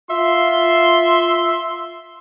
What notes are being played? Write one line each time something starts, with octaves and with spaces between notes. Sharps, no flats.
F4 E5 C6